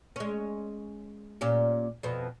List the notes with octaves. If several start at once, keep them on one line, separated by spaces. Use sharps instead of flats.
G#3 C#4
A#2 C#4 G4
F2 B2